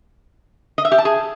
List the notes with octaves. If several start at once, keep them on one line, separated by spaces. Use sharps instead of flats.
D#5
E5
G4
A5
G#4